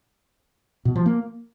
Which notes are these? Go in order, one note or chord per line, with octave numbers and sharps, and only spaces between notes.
B2
F3
A#3